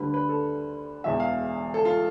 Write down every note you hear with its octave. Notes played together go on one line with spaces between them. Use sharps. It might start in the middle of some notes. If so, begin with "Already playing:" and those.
Already playing: D2 D3 G3 B4
B4
A4
E1 E2 B2 E5
F5
A4
F4